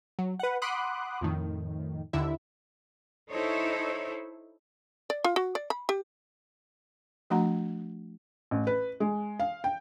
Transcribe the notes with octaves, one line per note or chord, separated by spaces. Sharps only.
F#3
B4 F#5
F#5 B5 C6 D6 D#6 F#6
F2 A2 D#3
D#2 D3 E4 E5
D#4 E4 A4 C5 C#5
D5
F4
F#4
D5
B5
G4
F3 A3 D4 F#4 F#5 A#5
A1
B4
G#3
F5
G5